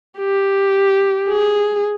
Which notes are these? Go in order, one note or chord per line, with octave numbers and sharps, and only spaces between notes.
G4
G#4